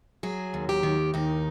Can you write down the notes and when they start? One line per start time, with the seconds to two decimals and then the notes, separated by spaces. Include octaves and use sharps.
0.23 F#3 G#4
0.54 D#2
0.69 G4
0.83 D#3
1.14 D#2 D#4